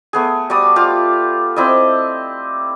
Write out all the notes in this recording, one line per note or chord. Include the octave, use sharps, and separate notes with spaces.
A3 B3 G#4
G3 F#4 D5 D#6
F4 G4 F5
C4 E4 D5 D#5